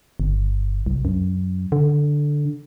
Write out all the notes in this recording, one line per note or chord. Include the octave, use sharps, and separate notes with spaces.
G1
C2
F#2
D3